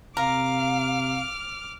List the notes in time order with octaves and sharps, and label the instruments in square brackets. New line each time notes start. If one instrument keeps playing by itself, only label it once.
[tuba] C3 [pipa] A#4 [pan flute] F5 [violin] D6 F6